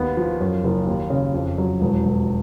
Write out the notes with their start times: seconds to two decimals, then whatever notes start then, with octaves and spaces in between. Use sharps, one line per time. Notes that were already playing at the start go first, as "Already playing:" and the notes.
Already playing: D#2 D#3 B3
0.17 F3
0.40 F#2
0.64 F#1
0.87 D#2
1.10 C#3
1.34 F2
1.58 F#3
1.81 E1
2.05 E1